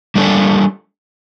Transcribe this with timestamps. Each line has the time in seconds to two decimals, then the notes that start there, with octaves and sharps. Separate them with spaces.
0.15 G3 A#3 D4 A4